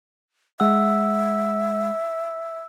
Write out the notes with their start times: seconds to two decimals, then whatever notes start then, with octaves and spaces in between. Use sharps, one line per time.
0.60 G#3 E5 F#5 E6